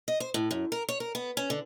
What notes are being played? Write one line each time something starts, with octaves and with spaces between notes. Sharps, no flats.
D#5
C5
A2
F#2
A#4
C#5
A#4
B3
C#4
D3